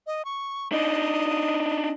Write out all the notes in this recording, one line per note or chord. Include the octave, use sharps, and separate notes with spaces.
D#5
C#6
D4 D#4 D#5